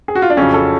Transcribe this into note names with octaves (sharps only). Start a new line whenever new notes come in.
G#4
F#4
F4
D4
F2 C#3 F#3 C#4
A4